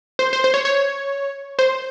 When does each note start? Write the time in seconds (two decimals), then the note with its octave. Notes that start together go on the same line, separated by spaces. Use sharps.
0.19 C5
0.33 C5
0.44 C5
0.54 C#5
0.65 C#5
1.59 C5